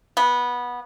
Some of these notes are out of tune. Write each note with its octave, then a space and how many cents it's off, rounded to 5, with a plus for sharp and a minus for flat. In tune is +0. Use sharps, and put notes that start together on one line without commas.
B3 -15